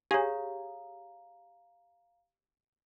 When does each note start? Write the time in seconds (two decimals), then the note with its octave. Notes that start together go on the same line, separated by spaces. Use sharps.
0.11 G4 G#4 C#5 F5 A#5